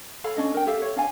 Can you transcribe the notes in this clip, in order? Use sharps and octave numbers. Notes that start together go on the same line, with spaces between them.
A4 C#5 F5 B5
C#4 D4 D#5
A#4 G5
G4 A4 E5 F5
C#5
D4 F5 G#5